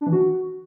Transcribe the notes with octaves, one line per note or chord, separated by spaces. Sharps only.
D4
E3
F#4